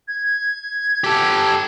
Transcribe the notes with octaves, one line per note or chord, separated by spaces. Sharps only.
G#6
G4 A4